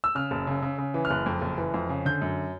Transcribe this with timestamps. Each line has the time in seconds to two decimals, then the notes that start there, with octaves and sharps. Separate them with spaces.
0.04 E6
0.15 C#3 F6
0.31 F#1
0.47 C#3
0.62 C#3
0.78 C#3
0.94 E3
1.05 F6
1.10 F#1 F#6
1.26 F2
1.42 F#1
1.58 E3
1.74 F2
1.89 C#3
2.05 D3 G6
2.22 F#2